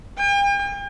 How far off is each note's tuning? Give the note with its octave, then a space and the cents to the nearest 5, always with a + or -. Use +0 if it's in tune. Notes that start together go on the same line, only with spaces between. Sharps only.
G5 +45